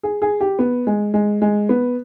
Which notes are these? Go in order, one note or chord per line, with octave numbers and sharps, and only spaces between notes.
G#4
G#4
G4
B3
G#3
G#3
G#3
B3